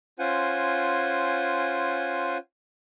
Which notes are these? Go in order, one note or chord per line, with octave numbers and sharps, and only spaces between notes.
C#4 F4 C5 F#5 G#5